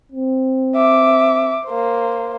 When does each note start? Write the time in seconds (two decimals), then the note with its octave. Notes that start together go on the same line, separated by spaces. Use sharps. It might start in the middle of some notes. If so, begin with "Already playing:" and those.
0.12 C4
0.75 E5 D6
1.65 A#3 C5